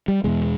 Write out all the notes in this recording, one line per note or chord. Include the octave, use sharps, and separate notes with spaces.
G3
E2 B2 G#3